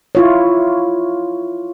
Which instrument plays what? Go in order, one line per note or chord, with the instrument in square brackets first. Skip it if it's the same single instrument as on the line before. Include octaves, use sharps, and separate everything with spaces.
[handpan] E4 F4 C#5